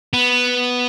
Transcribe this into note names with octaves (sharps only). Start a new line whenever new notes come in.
B3